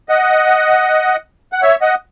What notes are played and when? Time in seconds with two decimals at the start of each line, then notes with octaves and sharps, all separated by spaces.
0.09 D#5 F#5
1.53 F#5
1.62 C#5 E5
1.81 D#5 F#5